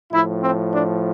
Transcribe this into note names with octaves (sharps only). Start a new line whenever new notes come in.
A2 F3 E4
C4
D4